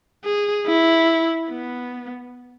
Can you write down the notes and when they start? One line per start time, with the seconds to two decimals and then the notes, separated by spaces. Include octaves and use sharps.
0.25 G#4
0.67 E4
1.50 B3